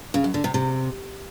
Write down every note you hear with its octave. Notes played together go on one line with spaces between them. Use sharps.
C#3
F#2
D3
C3
C3